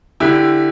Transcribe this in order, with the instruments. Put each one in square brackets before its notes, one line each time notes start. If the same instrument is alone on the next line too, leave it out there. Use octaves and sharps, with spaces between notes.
[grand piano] D3 E4 G4